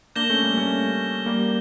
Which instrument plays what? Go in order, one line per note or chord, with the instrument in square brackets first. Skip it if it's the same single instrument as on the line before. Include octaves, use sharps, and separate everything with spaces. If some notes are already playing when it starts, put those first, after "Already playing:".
[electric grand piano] A#3 D4 [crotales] G6 A#6 E7 G7
[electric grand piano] A3 C#4
G3 A#3
A3 C#4
G3 A#3